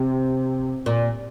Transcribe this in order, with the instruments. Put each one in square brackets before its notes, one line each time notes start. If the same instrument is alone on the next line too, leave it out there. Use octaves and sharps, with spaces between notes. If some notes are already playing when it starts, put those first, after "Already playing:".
Already playing: [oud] C3
A#2